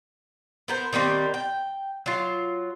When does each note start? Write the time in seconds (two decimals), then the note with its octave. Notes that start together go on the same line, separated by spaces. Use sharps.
0.68 B3 A#4 C5
0.93 D#3 G3 A#3 C4
1.34 G5
2.06 F#3 F4